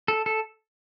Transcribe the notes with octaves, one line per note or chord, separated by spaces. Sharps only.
A4
A4